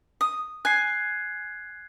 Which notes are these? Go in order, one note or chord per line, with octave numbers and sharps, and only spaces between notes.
D#6
G#5 F#6 G#6 C7